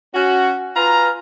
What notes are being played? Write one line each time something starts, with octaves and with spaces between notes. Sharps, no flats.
C#4 F#4
F4 B4 G#5 A#5